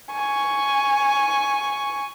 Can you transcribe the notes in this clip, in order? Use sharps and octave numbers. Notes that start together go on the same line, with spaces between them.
G#5 C#6